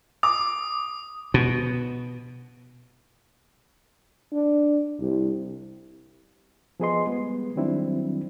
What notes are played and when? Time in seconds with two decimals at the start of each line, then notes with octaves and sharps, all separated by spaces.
0.23 D6 D#6
1.34 B2
4.33 D4
5.00 C2
6.80 F3 B3 G#4 B4 D#5 C6
7.07 G3 G#3 B3
7.56 D#3 F#3 G3 C4 D4 E4